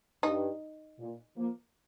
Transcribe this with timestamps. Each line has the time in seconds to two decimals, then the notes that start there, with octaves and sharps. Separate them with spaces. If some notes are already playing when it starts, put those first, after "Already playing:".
0.23 G2 D#4
0.99 A#2
1.36 F3 A#3